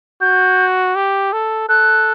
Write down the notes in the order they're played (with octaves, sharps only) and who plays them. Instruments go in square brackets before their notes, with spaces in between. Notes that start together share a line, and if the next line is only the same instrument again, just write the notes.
[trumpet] F#4 [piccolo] G6
[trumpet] G4
A4
[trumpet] A4 [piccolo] F#6